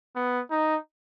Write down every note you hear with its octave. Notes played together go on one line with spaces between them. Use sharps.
B3
D#4